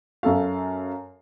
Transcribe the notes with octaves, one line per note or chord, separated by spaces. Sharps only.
F#2 A4 F5